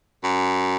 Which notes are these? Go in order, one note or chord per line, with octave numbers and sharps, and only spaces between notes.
F#2